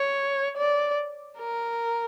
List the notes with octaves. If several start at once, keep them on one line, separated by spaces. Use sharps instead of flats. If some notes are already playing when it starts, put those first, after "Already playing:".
Already playing: C#5
D5
A#4